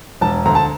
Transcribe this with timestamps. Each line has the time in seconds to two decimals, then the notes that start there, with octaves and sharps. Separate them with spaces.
0.21 E1 A5
0.45 D2 A#5
0.55 A5